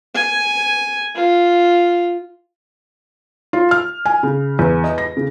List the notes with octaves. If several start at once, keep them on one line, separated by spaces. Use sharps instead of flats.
G#5
F4
F4
F6
G#5
C#3
E2
D#5
A#6
C#3